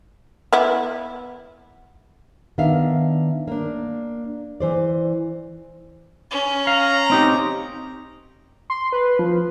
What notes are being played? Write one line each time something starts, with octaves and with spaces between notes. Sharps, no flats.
B3 E4
D#3 B3 D4 E5 F5
A#3 D4
E3 C5 D5
C#4
F5 A#5
C4 D#4 G4
C6
B4
F3